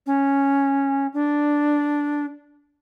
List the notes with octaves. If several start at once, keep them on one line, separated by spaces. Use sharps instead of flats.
C#4
D4